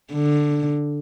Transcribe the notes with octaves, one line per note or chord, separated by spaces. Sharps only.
D3